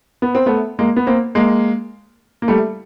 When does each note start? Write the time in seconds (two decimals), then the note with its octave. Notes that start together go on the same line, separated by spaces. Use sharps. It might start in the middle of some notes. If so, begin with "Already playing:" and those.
0.22 B3
0.35 C4
0.46 A3 B3
0.79 G#3 A#3
0.96 B3
1.07 A#3 C4
1.35 G#3 A#3
2.42 A#3
2.48 G3 A3